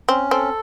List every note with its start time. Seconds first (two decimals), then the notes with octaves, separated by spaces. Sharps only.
0.09 C4 C#4
0.31 C4 A4